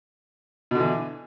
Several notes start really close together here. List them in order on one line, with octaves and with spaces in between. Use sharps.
B2 D3 E3